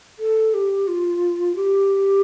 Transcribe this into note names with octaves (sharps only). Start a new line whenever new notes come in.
A4
G4
F4
G4